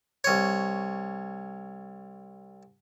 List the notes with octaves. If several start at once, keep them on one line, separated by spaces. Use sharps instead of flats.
C2 C#5